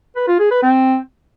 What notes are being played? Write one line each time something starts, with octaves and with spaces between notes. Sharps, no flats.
B4
F4
G#4
B4
C4